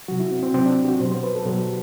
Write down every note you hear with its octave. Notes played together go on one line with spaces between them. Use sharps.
C3 F#3 F#4
E4
C4
C4
C3 F#3 C4
D4
G4
F#4
B2 F#3 C5
C5
B4
A4
B2 F#3 G4